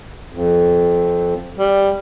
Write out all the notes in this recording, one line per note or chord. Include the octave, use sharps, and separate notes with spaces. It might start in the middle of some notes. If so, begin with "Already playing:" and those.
F2
G3